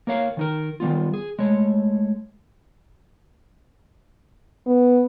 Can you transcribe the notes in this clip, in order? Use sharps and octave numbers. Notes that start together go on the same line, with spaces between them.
A#3 A#4 C#5 F5
D#3 D#4 A#4
D#3 G3 B3 F4
G#4
G#3 A3 C#5
B3